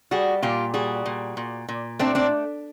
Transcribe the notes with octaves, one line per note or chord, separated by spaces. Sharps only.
G3 F#4 G#4
A#2 F4 G4
G3 F#4 G#4
A#2
A#2
A#2
A3 C4 D4
C4 D4